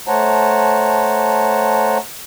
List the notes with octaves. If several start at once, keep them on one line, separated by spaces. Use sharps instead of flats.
A3 C5 C#5 F#5 A5 A#5